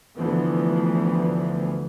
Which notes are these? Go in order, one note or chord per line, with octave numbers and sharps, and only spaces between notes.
D2 E3 F3 B3